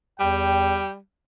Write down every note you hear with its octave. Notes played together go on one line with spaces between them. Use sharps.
E2 G3 G5